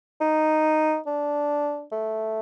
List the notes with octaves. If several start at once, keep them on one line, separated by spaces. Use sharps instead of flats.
D#4
D4
A3